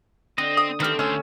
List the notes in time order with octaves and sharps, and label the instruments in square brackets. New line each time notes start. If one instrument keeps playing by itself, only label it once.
[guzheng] D3 [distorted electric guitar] C4 [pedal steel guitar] D#5
[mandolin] D#6
[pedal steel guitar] D#3 B4 F6 [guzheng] A3 G4 [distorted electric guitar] C4
[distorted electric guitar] D2 [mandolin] C#4 E6 [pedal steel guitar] C5